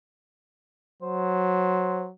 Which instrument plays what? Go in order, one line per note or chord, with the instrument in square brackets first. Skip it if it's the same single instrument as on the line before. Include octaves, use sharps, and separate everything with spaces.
[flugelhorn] F#3 [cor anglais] C5